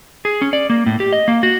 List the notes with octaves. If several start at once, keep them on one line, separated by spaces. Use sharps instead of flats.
G#4
C#4
D5
A#3
A2
G4
D#5
A#3
F#4